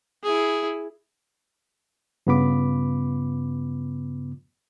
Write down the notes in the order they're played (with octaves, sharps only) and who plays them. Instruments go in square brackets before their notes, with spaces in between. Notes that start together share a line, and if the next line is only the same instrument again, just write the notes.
[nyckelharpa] E4 G#4
[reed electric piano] G2 C#3 B3 F4 B5 D6